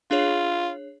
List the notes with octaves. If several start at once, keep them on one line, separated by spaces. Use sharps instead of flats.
D4 F4 G#4 C#5